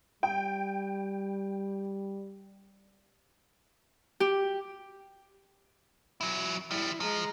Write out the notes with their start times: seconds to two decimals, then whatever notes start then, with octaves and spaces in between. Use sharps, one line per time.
0.23 G3 G5
4.20 G4
6.21 F#3 E4
6.71 F3 G3 E4
7.00 F3 G#3 A#5